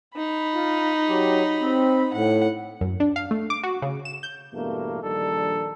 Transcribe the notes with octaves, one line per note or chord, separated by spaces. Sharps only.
D#4 B5
F4
F#3 G4
C4
A2 F#5
F#2
D4
F5
A3
D6
F#4
C#3
E7
G6
E2 G2 B2 A3 A#3
A#1 D#3 G3 D4 D#4 A4